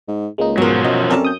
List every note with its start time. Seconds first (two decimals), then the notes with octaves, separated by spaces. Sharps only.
0.08 G#2
0.38 C#2 G#3 A#3 D#4
0.58 G#2 B2 F3 F#3 A#4
0.84 F#2 D#5
1.10 C4 C#4 A4 A#4 D5 A5
1.25 D#6 G6